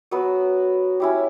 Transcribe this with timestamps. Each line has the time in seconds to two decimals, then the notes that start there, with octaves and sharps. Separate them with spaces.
0.11 F#3 B3 F#4 B4
1.00 C#4 E4 G4